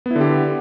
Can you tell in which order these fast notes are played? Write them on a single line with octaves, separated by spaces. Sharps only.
B3 E4 D3 G4